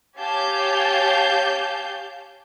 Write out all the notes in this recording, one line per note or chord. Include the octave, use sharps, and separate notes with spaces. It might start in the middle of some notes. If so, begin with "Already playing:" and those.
G4 C#5 F5 G#5 A5 G6